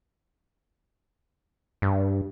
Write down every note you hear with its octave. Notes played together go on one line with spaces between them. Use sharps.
G2